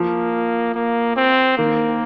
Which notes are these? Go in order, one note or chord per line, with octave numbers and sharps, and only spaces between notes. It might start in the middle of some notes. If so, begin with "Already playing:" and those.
Already playing: F3 A#3
A#3
C4
D#3 A#3